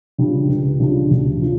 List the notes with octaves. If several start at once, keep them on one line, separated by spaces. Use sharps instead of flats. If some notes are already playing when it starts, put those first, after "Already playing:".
C#3 G3 D4 F4
C#2
C#3 G3 D4 F4
D2
C#3 F3